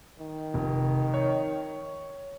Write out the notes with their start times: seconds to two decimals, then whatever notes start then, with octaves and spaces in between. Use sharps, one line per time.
0.19 D#3
0.54 F1
1.14 C#5